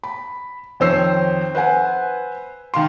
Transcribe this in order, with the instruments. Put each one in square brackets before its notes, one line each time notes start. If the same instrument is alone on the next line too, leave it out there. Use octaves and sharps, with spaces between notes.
[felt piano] B5
F2 D#3 C5 C#5 E6 C7
B4 C5 F#5 G#5
D#3 F5 C6